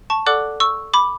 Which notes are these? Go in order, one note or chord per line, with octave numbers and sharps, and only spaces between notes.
A5 C#6
A4 D5 F#5 D6 F#6
C#6 E6
B5 D6